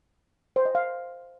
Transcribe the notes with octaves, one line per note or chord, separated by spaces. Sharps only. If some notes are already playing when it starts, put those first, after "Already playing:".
C5
D#5
F5